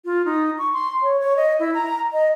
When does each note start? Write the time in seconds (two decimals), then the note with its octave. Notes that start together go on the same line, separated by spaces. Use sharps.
0.05 F4
0.25 D#4
0.58 C#6
0.73 C6
1.03 C#5
1.20 C#5
1.37 D#5
1.59 E4
1.74 A#5
2.13 D#5